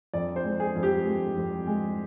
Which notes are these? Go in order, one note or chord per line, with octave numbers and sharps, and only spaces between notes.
F2 D5
C5
G#3
G#4
F2
G4
G#3
F2
G#3